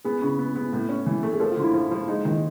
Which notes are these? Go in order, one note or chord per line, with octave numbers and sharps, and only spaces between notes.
B3 G#4
C#3
B3
B3
A2
C#4
E3
A3
G#4
F3 A4
F4
D3
E4
F3
F3
G#3 D#4
D#3